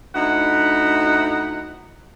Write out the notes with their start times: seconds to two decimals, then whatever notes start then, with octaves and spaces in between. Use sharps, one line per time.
0.14 D2 D#4 E4 F#5